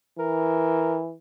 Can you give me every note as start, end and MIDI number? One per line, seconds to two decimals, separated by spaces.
0.19 1.15 52
0.19 0.99 70